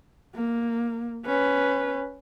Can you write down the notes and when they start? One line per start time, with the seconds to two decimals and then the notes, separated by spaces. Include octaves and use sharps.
0.35 A#3
1.26 C#4 B4